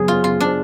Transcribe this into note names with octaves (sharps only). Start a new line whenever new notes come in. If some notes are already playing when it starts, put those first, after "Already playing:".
Already playing: F#2 C#3 F#3 B3 G#4
F4
F4
D4